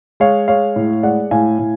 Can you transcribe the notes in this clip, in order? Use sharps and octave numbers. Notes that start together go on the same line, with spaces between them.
G#3 C#5 F5
G#3 C#5 F5
A2
G#3 D5 F#5
A2 F5 G#5
A2